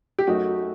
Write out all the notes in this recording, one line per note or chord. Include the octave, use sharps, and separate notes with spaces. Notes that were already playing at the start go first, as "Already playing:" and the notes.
G4
F#2 F#3 A3 D#4 F#4